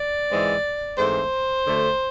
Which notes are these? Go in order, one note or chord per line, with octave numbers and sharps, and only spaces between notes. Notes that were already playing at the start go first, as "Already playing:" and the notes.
Already playing: D5
G#2 E3 G#3 C4
G#2 E3 A3 C4 C5
D2 D3 A3